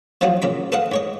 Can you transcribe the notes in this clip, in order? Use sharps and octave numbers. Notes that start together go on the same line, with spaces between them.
F3 F#3 C4 D#4 F4 F#4
A#2 C#3 A#5 B5
A4 B4 C5 D#5 F5 F#5
G#2 C#5 D#5